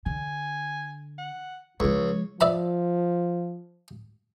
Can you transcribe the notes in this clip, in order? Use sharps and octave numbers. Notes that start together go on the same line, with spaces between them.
D3 G#5
F#5
C#2 F3 G#3 C#5
F3 D5 E5 B5